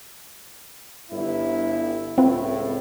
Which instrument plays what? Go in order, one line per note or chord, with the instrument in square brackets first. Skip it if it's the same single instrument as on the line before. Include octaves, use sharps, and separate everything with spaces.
[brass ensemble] G1 E4
[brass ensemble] C#2 A2 [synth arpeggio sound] C4 F4 B4